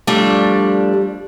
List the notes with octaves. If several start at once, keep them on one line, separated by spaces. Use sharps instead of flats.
F3 G3 A3 D4